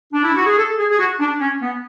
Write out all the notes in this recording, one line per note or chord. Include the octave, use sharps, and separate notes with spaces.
D4
E4
F#4
G#4
A4
G#4
G#4
F#4
D4
C#4
B3